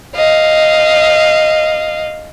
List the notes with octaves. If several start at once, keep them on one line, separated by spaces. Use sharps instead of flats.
D#5 F5